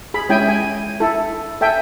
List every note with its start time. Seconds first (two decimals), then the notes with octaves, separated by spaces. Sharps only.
0.14 G#4 B5
0.29 G#3 C#4 E4 G#4 G5 G#5
0.49 G#5
1.00 E4 A4
1.61 A4 E5 G5 G#5